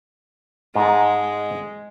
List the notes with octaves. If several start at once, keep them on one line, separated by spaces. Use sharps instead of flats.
G#2 G#3 A5 A#5